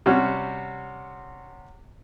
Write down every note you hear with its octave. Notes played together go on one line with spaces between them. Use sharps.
C3 G3 C#4 F#4